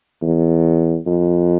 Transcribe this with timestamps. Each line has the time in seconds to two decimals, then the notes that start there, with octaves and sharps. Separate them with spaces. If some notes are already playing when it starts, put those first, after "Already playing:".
0.22 E2
1.06 F2